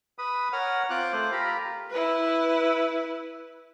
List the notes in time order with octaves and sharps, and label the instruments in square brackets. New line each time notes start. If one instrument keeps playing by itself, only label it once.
[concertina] B4 B5 D#6
A#4 C#5 F#5 F6
C4 F4 D6 F#6
A3 C5
F4 G4 A#4 A#5 B5
[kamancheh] E4 B4